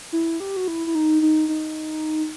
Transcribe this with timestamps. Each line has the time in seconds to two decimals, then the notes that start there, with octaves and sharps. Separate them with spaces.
0.13 E4
0.40 G4
0.57 F#4
0.68 E4
0.87 E4
0.95 D#4
1.22 D#4
1.49 D#4